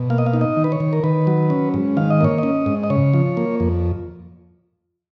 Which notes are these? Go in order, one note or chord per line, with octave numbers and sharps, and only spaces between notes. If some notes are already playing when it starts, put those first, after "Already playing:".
Already playing: B2
A#3 F5
D#5
F5
D#4
D#5
D#3
B4
C#5
D#3
A#4
D#3 B4
F#3
C#4
G#2
D#3 F5
D#5
A#3 C#5
C#4 D#5
G#2
D#5
C#3 C#5
F3
A#3
F2